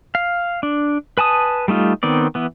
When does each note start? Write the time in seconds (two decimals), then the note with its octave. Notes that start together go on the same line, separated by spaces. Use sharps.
0.15 F5
0.63 D4
1.18 B4 G#5 A5 D#6
1.68 G3 A3 D#4 F4
2.03 D#3 B3 C4 D5
2.35 E3 B3